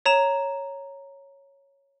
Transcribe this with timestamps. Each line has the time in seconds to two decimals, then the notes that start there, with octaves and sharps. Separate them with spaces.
0.06 C#5 A#5 E7